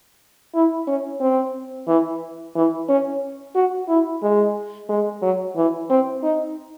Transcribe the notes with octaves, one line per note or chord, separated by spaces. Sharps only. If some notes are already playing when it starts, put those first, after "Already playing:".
E4
C#4
C4
E3
E3
C#4
F#4
E4
G#3
G#3
F#3
E3
C4
D#4